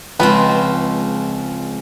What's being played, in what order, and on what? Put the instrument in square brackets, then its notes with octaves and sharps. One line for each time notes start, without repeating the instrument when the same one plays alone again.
[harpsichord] C#2 [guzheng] F3 G#3 C4 [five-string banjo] B4